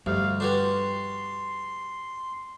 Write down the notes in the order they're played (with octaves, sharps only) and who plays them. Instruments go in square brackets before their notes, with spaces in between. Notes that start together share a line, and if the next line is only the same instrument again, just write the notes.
[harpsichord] D2 [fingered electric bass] G2 [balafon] F3 G4 A4 [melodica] F5
[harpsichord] D4 F#4 G4 [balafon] A4 B4 [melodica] C6